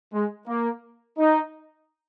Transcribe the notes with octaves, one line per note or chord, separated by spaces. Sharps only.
G#3
A#3
D#4